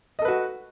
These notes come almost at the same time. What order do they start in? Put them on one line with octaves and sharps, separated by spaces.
D#5 A4 B4 F#4